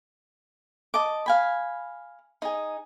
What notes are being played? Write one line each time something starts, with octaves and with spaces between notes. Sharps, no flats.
D#5 A5 D6
F5 G#5 B5
D#4 G#4